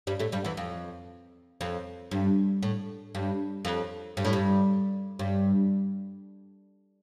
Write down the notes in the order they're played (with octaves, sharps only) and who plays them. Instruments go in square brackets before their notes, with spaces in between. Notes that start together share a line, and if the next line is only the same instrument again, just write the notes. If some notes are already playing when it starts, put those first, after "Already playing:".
[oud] G2 G3
A2 A3
G2 G3
E2 E3
F2
F2
G2
A2
G2
F2
G2
A2
G2
G2